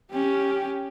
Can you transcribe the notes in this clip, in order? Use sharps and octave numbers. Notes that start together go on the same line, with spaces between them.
C#4 G4